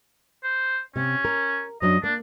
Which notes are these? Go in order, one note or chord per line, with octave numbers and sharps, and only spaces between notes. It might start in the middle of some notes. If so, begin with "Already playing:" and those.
C5
C3 C#4
A#4
F#2 F#3 D4 D#5
A#3 D4